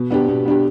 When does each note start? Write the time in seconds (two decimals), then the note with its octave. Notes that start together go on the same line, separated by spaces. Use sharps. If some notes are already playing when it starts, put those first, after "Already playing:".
Already playing: B2
0.11 B3 D4 G4
0.28 B2
0.45 B3 D4 G4